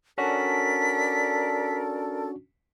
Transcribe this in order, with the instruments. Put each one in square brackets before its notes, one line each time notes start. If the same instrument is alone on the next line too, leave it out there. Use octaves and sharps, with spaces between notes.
[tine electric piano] C#4 D4 F#4 [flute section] A4 A#4 D5 [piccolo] B6